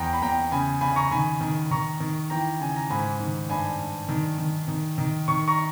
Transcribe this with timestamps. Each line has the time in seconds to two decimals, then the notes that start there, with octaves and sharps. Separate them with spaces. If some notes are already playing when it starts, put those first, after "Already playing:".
Already playing: E2 G5 A#5
0.13 B5
0.22 E2 G5 A#5
0.52 C#3 G#5 B5
0.81 C#3 G#5 B5
0.96 A#5 C#6
1.11 D#3 G#5 B5
1.41 D#3
1.71 D#3 A#5 C#6
2.00 D#3
2.30 E3 G5 A#5
2.60 C#3 G#5
2.76 A#5
2.90 G#2 G#5 B5
3.19 D#3
3.49 G2 G#5 B5
3.79 G2
4.09 D#3
4.38 D#3
4.68 D#3
4.98 D#3
5.28 D#3 C#6
5.48 A#5 C#6